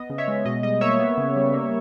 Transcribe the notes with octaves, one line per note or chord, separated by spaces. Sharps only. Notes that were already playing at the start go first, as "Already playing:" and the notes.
Already playing: B3 D#5
C#3
C#5 E5
G#3
B2 D#5
G3 D#5
A#3 C#5 E5
B3
C#3
G3
A#3